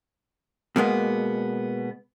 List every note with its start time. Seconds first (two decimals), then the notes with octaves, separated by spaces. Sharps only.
0.76 B2 G#3 A#3 B3